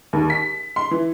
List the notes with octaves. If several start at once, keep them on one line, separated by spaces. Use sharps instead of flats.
D#2
B6
C6
E3